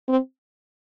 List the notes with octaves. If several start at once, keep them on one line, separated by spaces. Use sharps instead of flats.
C4